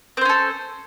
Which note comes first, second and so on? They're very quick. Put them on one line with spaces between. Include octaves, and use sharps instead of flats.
C4 C5 C#4 A4